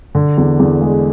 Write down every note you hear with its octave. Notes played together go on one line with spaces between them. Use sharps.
D3
E2
E2
G#3